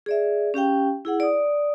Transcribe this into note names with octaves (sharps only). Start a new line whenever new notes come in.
G#4 D5 E5
C#4 G4 F5 G5
E4 G#4 F#5
D5 D#6